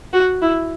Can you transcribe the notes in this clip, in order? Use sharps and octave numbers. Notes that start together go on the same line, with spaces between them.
F#4
E4